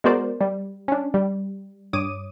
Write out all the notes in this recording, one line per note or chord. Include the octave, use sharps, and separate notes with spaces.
G#3 B3 F#4 A#4 C5 D5
G3
C#4 D4
G3
G2 C#5 D6 D#6 D#7